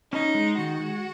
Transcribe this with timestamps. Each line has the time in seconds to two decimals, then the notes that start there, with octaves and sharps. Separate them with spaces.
0.12 C#4 D#4
0.35 G#3
0.57 D#3 F#4
0.80 G#3